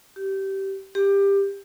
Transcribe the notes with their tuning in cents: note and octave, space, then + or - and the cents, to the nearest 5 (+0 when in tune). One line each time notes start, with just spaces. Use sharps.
G4 -20
G4 +20